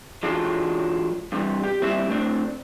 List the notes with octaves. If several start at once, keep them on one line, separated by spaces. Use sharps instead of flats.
E3 F#3 G#3 D4 F4 A4
G2 C3 E3 G3
G4
D#2 G3 C4 E4 E5
A3 C4 D4